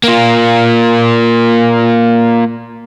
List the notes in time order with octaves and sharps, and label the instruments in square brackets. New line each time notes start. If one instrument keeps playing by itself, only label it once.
[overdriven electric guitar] A#3 F4